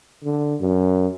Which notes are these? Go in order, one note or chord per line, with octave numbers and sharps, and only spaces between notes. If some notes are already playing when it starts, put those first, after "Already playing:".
D3
F#2